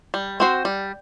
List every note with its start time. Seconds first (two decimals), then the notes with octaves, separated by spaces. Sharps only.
0.14 G3
0.40 C4 F#4 C5
0.65 G3